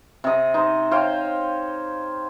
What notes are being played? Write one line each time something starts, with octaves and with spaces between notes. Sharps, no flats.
C3 D#5
D#4 C5
C5 C#5 F5 G5